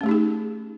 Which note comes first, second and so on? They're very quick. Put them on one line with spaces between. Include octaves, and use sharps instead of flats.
C#4 A3 G4 D#4 G#4